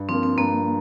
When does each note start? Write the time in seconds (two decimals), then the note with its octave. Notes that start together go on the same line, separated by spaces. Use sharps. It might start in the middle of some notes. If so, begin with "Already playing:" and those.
Already playing: G2
0.09 F3 A#3 C4
0.23 C4
0.37 G2 A#3